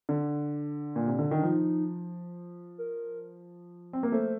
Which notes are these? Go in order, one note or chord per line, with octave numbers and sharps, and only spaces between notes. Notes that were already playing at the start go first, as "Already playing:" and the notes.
D3
A#2
C3
D3
D#3
D4
F3 D#4
A#4
C4
A#3
A3 C5